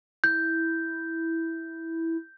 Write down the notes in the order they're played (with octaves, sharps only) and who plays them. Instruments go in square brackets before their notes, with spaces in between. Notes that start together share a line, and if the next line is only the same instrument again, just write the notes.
[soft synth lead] E4 [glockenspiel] G6